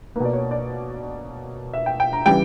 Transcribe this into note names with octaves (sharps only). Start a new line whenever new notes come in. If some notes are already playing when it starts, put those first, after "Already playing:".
B2 A#3 B4 D5
C#5
D5
E5
G5
G5
A#5
C#3 E3 G3 G5